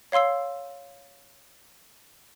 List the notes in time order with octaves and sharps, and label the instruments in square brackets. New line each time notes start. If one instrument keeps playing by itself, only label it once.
[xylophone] C#5 F5 C6 E6 C7